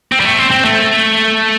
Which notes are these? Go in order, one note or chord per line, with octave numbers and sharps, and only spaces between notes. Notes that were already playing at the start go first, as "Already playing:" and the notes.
C4
G3
A3
C4
C4
A3